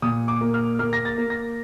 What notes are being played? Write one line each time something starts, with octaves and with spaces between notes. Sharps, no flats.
A#2 D#6
D6
A#3
F6
A#3 F6
A#6
A6
A#3
A#6